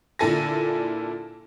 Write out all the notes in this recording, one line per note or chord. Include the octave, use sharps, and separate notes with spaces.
A#2 D3 E4 A4 G#5 A#6